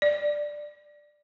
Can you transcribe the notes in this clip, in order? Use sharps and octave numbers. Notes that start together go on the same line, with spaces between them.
D5